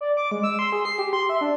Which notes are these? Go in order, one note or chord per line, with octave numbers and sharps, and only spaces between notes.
D5
D6
G#3
E6
C6
G#4
C7
G4
C6
E5
D4